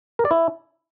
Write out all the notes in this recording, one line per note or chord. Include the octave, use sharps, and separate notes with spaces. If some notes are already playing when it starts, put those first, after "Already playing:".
A#4
D5
E4